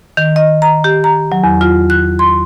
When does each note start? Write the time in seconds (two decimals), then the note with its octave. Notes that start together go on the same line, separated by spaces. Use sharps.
0.17 D#3
0.36 D#5
0.62 A#5
0.84 G4
1.04 A#5
1.32 F#3
1.44 E2
1.61 F4
1.90 F#6
2.19 C6